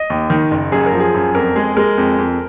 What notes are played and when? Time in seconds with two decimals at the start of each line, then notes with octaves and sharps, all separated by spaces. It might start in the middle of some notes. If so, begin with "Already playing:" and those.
Already playing: D#5
0.10 D#2
0.30 D#3
0.51 F#1
0.72 F#2 G#4
0.86 A#4
0.93 F3
1.00 G#4
1.14 F#2
1.35 F2 A#4
1.56 G#3 G#4
1.77 G#3 A#4
1.98 F2
2.18 F2